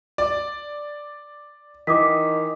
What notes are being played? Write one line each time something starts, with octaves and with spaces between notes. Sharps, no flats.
D5
D#3 E3 D6 D#6 B6